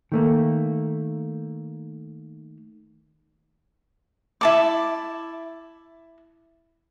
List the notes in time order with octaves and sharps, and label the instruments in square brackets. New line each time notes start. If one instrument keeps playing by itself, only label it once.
[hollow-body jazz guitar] D#3 A3 A#3
[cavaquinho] E4 A5 D6